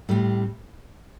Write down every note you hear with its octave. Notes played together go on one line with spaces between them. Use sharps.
A2 G3 C4